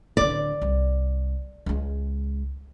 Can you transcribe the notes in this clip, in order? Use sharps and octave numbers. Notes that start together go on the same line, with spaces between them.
D1 D3 D5
C2
C#2 G#3